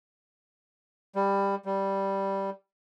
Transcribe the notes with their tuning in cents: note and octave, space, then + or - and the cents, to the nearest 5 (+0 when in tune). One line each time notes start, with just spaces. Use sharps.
G3 +15
G3 -5